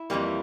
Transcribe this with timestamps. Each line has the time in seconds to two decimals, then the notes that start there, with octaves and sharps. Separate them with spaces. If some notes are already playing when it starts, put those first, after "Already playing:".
Already playing: E4
0.10 F2 E3 G3 A#3